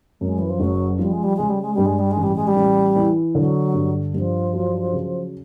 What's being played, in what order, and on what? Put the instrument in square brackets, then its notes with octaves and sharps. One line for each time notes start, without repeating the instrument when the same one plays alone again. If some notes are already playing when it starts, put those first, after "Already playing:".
[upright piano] F#2 [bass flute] G#3
[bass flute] E3
F3
[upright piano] F#1 [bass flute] F#3
[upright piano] F3 [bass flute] G3
[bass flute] G#3
G3
[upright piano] C#3 [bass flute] G#3
[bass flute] G3
G#3
[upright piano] G2 [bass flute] G3
[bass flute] G#3
G3
G#3
[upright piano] A1
[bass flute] G3
G#3
G3
[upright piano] A1
E3
[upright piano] D3 [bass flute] F#3
[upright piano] G2
[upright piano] G2 [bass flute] F3
[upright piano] F#3
C#3